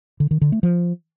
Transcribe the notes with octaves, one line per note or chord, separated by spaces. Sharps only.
D3
D#3
D3
A3
F3